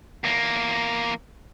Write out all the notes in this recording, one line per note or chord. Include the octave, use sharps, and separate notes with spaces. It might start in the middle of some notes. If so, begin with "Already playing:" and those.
E2 A#3